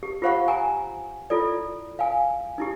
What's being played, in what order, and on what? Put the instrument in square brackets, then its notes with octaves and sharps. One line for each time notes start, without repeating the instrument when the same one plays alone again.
[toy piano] G4
F4 G4 C5 F5 F#5 C#6
G#5 A#5
E4 F4 A4 D5
F5 G#5
D#4 E4 G4